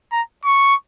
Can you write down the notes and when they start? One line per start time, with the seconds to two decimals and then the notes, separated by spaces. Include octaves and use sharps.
0.12 A#5
0.45 C#6